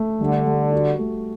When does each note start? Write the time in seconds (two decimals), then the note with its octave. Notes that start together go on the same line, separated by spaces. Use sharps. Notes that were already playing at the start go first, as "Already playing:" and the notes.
Already playing: A3
0.20 D3 G3
0.46 G3
0.72 F#4
0.99 A3